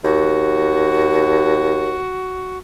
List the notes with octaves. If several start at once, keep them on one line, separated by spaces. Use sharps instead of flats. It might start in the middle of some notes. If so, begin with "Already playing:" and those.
D#2 F#4